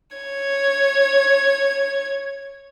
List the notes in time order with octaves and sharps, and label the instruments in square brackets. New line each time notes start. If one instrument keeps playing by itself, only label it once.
[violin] C#5 G#6